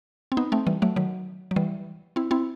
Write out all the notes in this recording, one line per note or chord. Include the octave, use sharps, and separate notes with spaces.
C4
B3 D#4
A3 C4
E3 G3
F#3 A3
D#3 F#3
F#3
E3 G3
C4 E4
C4 E4